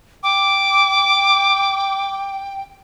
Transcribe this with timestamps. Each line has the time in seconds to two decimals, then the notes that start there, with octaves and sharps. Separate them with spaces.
0.23 G5 D6